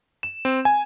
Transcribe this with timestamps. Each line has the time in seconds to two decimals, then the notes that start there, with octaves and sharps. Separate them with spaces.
0.23 E7
0.45 C4
0.65 G#5